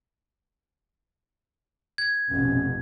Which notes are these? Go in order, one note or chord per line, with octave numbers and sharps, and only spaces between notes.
G#6
F1 A#1 B2 C#4